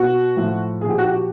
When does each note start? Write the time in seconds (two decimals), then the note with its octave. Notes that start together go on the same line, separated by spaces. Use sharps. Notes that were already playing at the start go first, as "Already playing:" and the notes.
Already playing: B2 F#4
0.37 A2 F3
0.81 A#2 F3 G#4
0.90 G4
0.98 F#4
1.06 G4